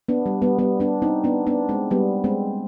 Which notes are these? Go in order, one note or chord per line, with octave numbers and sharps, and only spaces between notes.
B3 D4
G3
G3 B3
G3 B3
B3 D4
C4 D#4
B3 D4
B3 D4
G#3 C4
G3 B3
G#3 C4